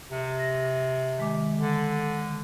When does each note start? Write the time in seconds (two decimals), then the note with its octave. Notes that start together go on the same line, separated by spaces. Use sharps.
0.11 C3
0.38 A#6
1.18 D#3 G#3 D6
1.57 D3